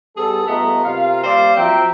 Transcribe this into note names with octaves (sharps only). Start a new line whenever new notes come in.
G3 B3 G#4 A4
G2 A3 B3 F4 D#5 A#5
C3 C4 F4 A#4 F5
G3 A#3 C5 D5 F5 C6
F3 F#3 C4 E5 G5 A#5